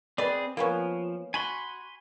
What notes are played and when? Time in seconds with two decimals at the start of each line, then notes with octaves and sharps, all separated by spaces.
0.18 C4 G#4 B4 D5
0.57 F3 A#3 B3 C#4
1.34 F#4 G#5 B5 C6